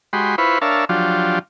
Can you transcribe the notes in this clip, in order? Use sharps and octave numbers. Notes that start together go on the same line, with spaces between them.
G#3 F#4 G4 B5 C6
E4 F4 B4 C5 B5 C#6
D4 A#4 C#5 E5 F5 A5
F3 F#3 D4 F4 G4